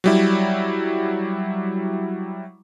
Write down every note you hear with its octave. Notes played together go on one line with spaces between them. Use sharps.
F#3 G3 E4